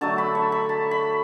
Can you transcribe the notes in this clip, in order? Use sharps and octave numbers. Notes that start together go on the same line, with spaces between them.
D3 F#3 A3 A5
B5
C#6
B5
A5
B5